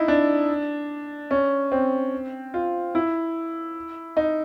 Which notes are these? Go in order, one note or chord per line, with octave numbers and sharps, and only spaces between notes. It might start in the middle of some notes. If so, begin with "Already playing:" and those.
Already playing: D#4 E4
D4
C#4
C4
F4
E4
D#4